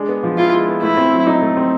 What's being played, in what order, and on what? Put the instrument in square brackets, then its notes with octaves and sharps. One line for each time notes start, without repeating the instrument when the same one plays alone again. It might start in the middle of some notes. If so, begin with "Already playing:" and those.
Already playing: [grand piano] G#3 D4
B3
F3
[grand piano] E4 [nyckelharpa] F4
[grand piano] G#3
B3
[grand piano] A3 [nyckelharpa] E4
[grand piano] C4
F#3
D#4
A3
C4